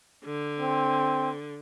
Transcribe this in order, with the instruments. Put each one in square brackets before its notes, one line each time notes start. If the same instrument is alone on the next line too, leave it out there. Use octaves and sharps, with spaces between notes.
[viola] D3
[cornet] C4